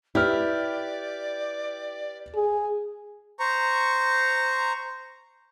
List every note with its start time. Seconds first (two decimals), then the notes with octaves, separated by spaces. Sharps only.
0.15 E4 G4 B4 D5 F6
2.35 G#4
3.39 C5 A#5 C#6